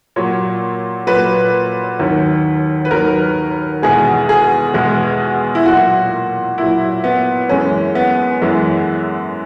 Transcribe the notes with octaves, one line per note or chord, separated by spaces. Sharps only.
A#2 F#3 C#5
A#2 F#3 B4
D#2 D#3 F#3
B4
D#2 D#3 F#3 A#4
E2 B2 G#3 G#4
G#4
E2 B2 G#3
E4
A#2 F#3 F#4
A#2 F#3 E4
B3
F#2 E3 G#3 C#4
B3
F#2 E3 G#3